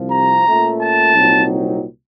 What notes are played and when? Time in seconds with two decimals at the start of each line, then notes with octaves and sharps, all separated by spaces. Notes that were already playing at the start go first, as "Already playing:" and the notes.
Already playing: C2 C3 F3
0.11 A#5
0.46 A#2 A3 C#4
0.80 A5
1.15 C2 A#2 F#3 C4 D#4